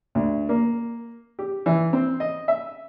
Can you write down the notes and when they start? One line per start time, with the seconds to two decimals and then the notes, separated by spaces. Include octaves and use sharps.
0.15 D2
0.49 A#3
1.39 G4
1.66 E3
1.93 C4
2.20 D#5
2.48 E5